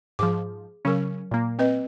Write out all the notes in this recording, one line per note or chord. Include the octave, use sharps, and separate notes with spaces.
G#2 F3 G#4 D6
C#3 F#3 C#4 A#4
A#2 A#3
C4 B4 D#5